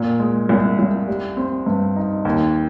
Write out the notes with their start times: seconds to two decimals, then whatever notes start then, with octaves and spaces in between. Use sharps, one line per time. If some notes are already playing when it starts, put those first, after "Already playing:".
Already playing: A#2
0.20 G#3
0.49 C2
0.79 C2
1.08 G3
1.37 C4
1.66 G2
1.96 D#4
2.25 D#2